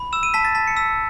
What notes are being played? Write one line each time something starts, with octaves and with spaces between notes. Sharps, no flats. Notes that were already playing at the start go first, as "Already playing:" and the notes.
Already playing: B5
E6 E7
D#7
A5 B6
A6
A5 B6
C#7
E6 B6